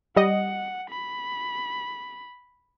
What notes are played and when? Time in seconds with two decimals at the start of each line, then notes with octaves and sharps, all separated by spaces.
0.16 G3 D#5 F#5
0.90 B5